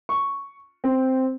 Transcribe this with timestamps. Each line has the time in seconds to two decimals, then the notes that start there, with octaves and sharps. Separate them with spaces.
0.09 C#6
0.84 C4